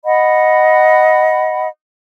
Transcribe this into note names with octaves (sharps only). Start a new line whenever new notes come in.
D#5 F#5 B5